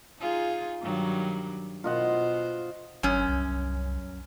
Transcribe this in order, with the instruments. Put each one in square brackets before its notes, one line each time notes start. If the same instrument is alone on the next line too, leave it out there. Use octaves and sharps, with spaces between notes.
[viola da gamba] D#4 F4 G#4
G2 D#3 F#3
[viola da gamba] B2 C5 [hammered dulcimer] F4 D#5 F#5
[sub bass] G#1 [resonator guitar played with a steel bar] F#2 C#4
[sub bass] C2